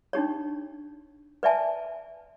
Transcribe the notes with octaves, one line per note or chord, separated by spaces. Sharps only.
D4 D#4 G4 C#5
B4 D5 E5 G#5 A5